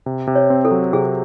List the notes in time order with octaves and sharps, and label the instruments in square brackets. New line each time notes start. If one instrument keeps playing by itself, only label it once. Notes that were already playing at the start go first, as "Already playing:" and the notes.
[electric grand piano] C3
C3
[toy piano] C#5
[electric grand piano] C4
[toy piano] A4
[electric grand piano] F#3
[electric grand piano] C3 [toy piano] G#4